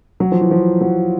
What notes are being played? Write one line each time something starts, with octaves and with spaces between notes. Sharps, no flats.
F#3
F3
E3
F3
F#3